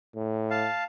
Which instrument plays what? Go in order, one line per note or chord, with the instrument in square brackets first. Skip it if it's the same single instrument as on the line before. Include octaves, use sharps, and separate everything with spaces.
[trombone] A2
[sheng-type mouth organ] F5 A5